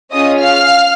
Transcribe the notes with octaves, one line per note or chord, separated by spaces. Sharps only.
C#4 F4 G#4 D#5 D#6
F5 F6